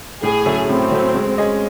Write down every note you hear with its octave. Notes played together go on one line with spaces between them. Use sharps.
A2 G#4
F#3 A3 C#4
A2 C4
F#3 A3 C#4
G#3
C#4 G#4 D#5